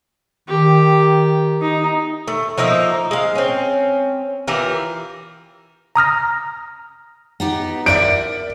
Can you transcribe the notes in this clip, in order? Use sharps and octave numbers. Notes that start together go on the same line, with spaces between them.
D#3 G4
D#4
A3
F3 A#3 D#4 E5
G#3 F5
C4 C#4
E3 F4 G4 A#4
A#5 D#6 F6 A#6
B3 D#4 G4
A#4 D5 E5 D7